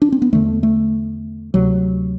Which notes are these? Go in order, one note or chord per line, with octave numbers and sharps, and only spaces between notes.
D4
C4
B3
E2 D3 A3
A3
D2 C3 F#3